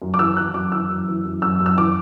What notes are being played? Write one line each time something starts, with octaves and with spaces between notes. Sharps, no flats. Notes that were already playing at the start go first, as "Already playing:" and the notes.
F#2
D6
E3 E6
E3 F#6
F#2 D6
E3 E6
F#2
E3
F#2
F#2 E6
F#2
E6
E3 D6